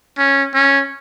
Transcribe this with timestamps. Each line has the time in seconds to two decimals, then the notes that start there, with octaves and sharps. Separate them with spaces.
0.18 C#4
0.54 C#4